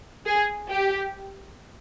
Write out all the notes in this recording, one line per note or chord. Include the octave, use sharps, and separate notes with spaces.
G#4
G4